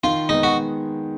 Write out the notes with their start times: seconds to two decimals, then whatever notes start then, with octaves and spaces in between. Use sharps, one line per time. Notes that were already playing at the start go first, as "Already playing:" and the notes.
0.04 D#3 F4
0.29 G#3 B3 D#4
0.43 F#4